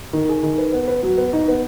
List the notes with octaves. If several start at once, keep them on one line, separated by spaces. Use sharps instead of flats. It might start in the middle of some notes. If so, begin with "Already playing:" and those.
D#3
G#4
D#3
B4
B3
B4
F#3
B3
D#4
B3